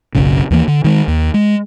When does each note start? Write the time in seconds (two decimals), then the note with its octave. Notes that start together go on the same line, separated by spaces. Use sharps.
0.15 F#1 B1 C#3
0.51 D#2 E3 A#3
0.68 D3
0.84 D#3 G#3
1.08 D#2
1.34 G#3